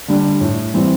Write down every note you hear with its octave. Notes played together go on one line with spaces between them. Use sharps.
D3 G3 D4
A2
E3 G3 C4